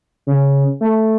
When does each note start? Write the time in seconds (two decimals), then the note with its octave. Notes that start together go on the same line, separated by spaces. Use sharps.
0.27 C#3
0.81 A3